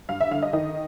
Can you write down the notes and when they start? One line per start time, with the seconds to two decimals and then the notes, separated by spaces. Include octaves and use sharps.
0.09 G2 F5
0.20 E5
0.31 D3 F5
0.42 D#5
0.53 D#3 D#5